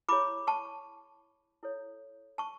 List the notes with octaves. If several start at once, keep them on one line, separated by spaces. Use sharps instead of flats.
E4 G#4 C#5 B5 D6
A5 C#6
E4 A4 C#5
A5 C#6